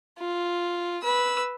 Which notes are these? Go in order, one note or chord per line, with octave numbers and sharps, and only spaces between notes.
F4
B4 E6